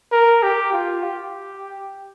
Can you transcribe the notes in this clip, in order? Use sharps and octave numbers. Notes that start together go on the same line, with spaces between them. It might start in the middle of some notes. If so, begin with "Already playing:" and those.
A#4
G4
F4
G4